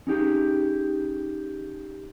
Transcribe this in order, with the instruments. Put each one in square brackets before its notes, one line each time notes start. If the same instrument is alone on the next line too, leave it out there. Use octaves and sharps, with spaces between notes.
[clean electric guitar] C#4 D#4 G4 G#4